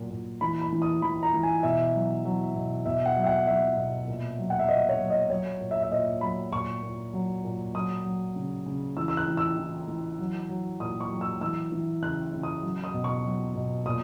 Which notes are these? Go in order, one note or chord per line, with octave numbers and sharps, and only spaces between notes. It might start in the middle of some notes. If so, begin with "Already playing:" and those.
Already playing: A#2 F#3
A#2
E3 B5
B5
E3
D#6
E3 B5
A#5
E3
G#5
B2 E5
F#3
F#3
B2
B2 E5
F#5
F#3
E5
F#5
F#3 E5
B2
A#2
F#3
F#5
E5
A#2 D#5
C#5
F#3
D#5
F#3 C#5
A#2
E5
E5
A#2 D#5
F#3 B5
A#2 C#6
A#2
F#3
A#2
F#3 D#6
F#3
C#3
C#3
E3 E6
E6
F#6
E3
E6
E3
E3
F#3
F#3
A#2 D#6
C#6
F#3
E6
E3 E6
E3
C#3 F#6
C#3
D#6
F#3
D#6
B2
C#6
F#3
B2
A#2 D#6